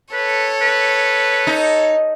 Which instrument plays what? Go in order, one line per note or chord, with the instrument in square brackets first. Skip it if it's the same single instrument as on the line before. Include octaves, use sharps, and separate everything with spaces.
[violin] A4 C#5 [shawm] B4
[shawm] B4
[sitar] D#4